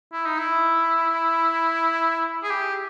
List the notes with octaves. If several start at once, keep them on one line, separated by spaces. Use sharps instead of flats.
E4
D#4
E4
G#4
G4